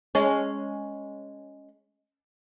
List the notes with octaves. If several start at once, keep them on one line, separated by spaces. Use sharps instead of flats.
G#3 C#4